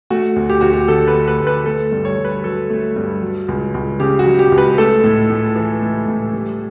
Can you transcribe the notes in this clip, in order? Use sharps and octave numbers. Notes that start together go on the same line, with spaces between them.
A3 F#4
D2
G4
D2 F#4
G4
D3 A4
B4
A3
B4
D2
B4
A3 A4
G2
C#5
G2
B4
F#3 A4
A3
G2
F#3
C#2
C#2
C#3 G4
F#4
F#3
G4
C#2
B4
A3 A4
A2
A2
E3
A3
A2
G3